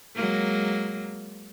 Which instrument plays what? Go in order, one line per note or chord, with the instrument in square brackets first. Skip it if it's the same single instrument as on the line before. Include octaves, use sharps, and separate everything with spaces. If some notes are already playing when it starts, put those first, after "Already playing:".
[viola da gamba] F#3 G#3 A#3